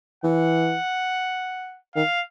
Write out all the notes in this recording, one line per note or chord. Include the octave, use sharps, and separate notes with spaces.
E3 F#5
D#3 F5